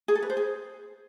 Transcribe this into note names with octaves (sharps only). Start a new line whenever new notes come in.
G#4
A4
B4
C5
G#4